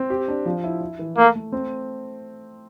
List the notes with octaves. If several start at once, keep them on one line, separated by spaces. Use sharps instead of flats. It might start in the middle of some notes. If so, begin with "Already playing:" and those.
Already playing: C4
G4
D4
F3
E4
E4
E3
A3 A#3
A3
C4